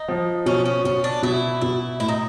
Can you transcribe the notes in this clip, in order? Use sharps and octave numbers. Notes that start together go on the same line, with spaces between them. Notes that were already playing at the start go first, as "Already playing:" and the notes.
Already playing: D#4
F3
B2 C#4
C#4
B2 C#4
D4
B2 E4
B2 E4
A2 E4
D#4